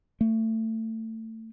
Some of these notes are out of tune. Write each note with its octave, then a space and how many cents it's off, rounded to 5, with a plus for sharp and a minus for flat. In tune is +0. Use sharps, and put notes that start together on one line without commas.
A3 +25